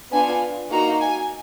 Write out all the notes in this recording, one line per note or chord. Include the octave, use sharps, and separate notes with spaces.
B3 D4 F4 G#5
A#3 D#4 F#4 A#5
G#5